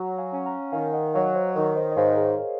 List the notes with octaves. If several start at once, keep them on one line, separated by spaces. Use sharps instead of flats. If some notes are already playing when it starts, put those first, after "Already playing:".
Already playing: F#3 F#5 A#5
F5 G#5
C#4 G#5
F#5 A#5
D#3 F5 G#5
D#5 F#5
F#3 C#5 F5
C5 D#5
C5
D#3 A#4 C#5
C5 D#5
D#5
G#2 C#5 F5
G#4
A#4